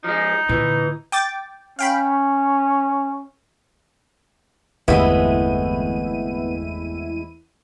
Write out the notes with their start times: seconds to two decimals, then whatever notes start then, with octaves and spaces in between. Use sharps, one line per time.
0.04 F3 G#3 D#4
0.49 A#2 D3 E3
1.12 G5 D6 A6
1.79 C#4 F5 G5 B5
4.88 G1 E2 G#3 A3 B3 C4 E4 D#7